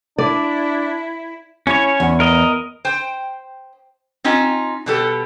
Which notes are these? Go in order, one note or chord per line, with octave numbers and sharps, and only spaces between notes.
D4 E4 D5
C#4 E4 C#5
E2
A#4 D#5
C5 G5
C4 C#4 D#4 F4
B2 G3 A4